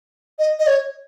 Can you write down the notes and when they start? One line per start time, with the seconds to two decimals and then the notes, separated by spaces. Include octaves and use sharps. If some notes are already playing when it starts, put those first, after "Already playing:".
0.39 D#5
0.59 D#5
0.67 C#5